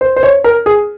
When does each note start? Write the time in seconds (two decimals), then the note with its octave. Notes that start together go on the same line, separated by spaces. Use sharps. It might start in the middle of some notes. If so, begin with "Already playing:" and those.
0.01 C5
0.16 C5
0.23 C#5
0.44 A#4
0.66 G#4